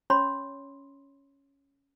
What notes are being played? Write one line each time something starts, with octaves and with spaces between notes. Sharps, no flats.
C#4 C#5 B5 C6